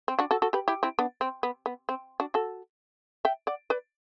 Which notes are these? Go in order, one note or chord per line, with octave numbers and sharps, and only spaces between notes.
C4
D4 F#4
F#4 A4
F#4 A4
G4 B4
E4 G4
C4 E4
B3 D4
C4
B3
B3
C4
D4 F#4
F#4 A4
E5 G5
D5 F#5
B4 D5